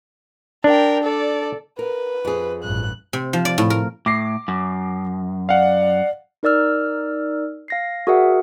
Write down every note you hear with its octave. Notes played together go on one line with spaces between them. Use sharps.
D4 A#4 G5
A4 D5
A#4 B4
F2 G#4
A1 G2 F#6
C3
F3
D5
A2
A#4
A2 D6 A#6 C7
F#2
D5 F5 F#5
D#4 A#4 D5 E6 F6
F5 A#6 C7
F#4 G#4 A#4 D5 E5 F#5